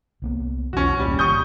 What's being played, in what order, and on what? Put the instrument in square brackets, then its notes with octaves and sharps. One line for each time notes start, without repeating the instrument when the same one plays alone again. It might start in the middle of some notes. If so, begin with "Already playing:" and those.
[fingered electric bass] C2 A#3 B3
[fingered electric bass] B1 E2 B2 [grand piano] C#4 F#4
[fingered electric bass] E1 C2 A#2 [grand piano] G3
[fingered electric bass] G#1 D#2 C3 [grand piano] C#6 D#6 G6